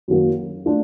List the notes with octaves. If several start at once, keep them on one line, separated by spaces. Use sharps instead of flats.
F#2 D#3 F#3 A#3
A3 D4 F4